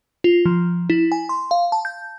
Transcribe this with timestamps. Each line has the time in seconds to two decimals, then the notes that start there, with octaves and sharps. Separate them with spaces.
0.24 F4
0.45 F3
0.90 E4
1.12 G#5
1.29 C6
1.51 F5
1.72 A5
1.85 G6